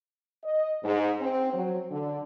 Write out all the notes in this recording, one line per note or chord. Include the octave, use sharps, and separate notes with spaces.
D#5
G#2
C4
F#3
D3